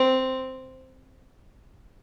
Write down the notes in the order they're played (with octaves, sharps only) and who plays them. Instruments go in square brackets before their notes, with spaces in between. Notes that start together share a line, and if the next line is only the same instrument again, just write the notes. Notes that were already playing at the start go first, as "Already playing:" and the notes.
Already playing: [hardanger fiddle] C4